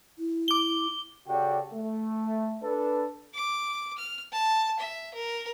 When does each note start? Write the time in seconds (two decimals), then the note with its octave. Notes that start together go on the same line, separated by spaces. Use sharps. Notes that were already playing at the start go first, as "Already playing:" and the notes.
0.18 E4
0.48 D6 G7
1.28 C#3 F#4 G4 A4 D5 G5
1.73 A3
2.63 D4 A4 B4
3.34 D6
3.98 F6
4.33 A5
4.80 E5
5.14 A#4